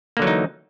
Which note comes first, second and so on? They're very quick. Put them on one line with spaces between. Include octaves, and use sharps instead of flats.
A#3 D3 F#3 E3 D#4